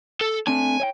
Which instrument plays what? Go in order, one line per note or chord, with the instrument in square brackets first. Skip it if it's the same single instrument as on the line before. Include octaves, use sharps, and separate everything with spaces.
[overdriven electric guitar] A4
[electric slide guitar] A3 C4 D4 [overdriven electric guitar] G#5
[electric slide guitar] C#5 D#5 G5